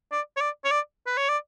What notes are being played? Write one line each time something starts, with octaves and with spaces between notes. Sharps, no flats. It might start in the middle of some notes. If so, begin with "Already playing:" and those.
D5
C#5
D5
C#5
D5
B4
C#5
D5